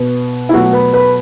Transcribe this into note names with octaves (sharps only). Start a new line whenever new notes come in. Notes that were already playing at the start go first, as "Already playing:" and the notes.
Already playing: B2 B3
E4
B2 F#3 A3 F#4
B4
B4